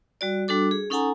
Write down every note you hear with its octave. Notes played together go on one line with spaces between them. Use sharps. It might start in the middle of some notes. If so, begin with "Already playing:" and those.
G3 F#4 D5
G3 D4 F#4 A4 D6
G#4
C#4 D#4 A4 F#5 G#5 A#5